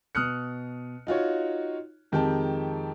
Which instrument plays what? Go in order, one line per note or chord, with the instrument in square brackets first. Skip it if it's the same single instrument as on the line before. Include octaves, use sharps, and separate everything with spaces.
[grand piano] B2 D#6 F6 F#6 C#7
D#4 F4 F#4 C#5
F2 D#3 G#3 G4 G5 A5